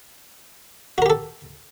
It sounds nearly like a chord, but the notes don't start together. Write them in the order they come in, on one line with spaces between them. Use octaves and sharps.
F#4 A#4 G4 A4